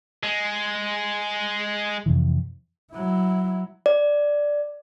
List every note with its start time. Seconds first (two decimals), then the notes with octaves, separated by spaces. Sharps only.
0.23 G#3
2.06 F2 C3 E3
2.93 F#3 E4
3.86 D5